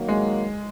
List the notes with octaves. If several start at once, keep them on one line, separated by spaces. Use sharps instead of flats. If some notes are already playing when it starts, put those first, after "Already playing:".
Already playing: D#3 F#3 A#3
G#3